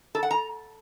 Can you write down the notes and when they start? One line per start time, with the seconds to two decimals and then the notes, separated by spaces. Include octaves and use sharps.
0.15 A4
0.23 F#5
0.31 A#5